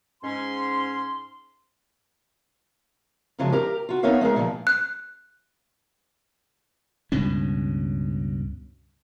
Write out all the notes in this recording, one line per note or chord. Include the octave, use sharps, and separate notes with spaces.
G#2 C#4 C6
F#2 C#3 F3 F#3 G#3
G4 A#4 A#5
F4 F#4
B3 D#4 A#4 C#5 E5 F5
G#3 A3 G#4 A#4
A#2 F3
F#6
C#2 G2 B2 C#4